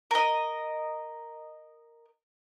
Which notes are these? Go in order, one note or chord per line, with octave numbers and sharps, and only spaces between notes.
A#4 D#5